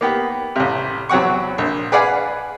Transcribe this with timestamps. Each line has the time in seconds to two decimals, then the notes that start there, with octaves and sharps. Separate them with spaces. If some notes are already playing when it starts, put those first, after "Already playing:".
0.01 A#3 B3 G4
0.56 A1 C3
1.09 E2 F#3 C4 F#5 C#6
1.58 A#1
1.92 G#4 B4 D5 F5 F#5 G#5